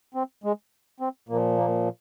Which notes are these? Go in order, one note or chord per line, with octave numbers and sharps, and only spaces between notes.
C4
G#3
C4
A#2 F3 A#3
A#3